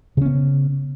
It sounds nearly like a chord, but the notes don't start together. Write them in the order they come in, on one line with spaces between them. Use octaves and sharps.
C#3 C#4 B3